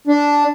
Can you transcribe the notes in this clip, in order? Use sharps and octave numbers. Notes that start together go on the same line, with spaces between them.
D4